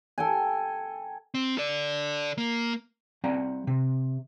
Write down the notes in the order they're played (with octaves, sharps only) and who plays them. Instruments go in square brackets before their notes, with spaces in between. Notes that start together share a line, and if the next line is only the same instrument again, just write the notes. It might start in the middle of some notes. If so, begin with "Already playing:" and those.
[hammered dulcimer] A4 G5 G#5
[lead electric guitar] C4
A4 D5
A#3
[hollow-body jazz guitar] G3 C4 F5 F#5 A#5
C3